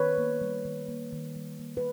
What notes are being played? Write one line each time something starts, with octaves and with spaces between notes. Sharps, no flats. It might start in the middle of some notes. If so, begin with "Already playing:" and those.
Already playing: D#3 B4 C#5
A#3
G3
D#3
A#3
D#3
G3
A#3
B4